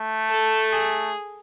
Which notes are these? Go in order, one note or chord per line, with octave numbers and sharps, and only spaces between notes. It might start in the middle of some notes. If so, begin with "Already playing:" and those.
Already playing: A3
A4
G#4